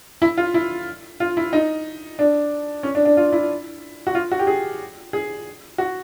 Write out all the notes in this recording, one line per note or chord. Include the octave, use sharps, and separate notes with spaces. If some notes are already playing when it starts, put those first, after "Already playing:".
E4
F4
E4
F4
E4
D#4
D4
C#4
D4
D4
F4
E4
F#4
F4
F#4
G4
G#4
G#4
F#4